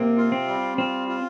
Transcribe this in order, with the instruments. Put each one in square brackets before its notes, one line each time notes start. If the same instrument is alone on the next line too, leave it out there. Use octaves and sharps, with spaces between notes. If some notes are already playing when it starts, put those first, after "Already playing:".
Already playing: [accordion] C3 [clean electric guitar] A#3
[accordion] F4
[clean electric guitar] C4
[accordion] G3
[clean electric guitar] C4 [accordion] F4
[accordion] F4